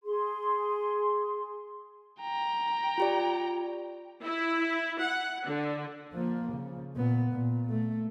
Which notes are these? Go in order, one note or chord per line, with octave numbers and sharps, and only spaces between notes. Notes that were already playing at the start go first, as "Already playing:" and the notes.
G#4 C6
G5 A#5
F4 G4 D5
E4
F#5
D3
F3 A#3
C#3
A#2 B3
A#2
A3